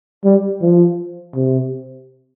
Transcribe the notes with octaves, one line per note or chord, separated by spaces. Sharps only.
G3
F3
C3